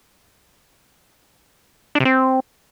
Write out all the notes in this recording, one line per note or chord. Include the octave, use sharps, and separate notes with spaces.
D4
C3
C4